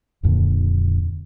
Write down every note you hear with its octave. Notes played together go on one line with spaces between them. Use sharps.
D#1 F2 A#2 D3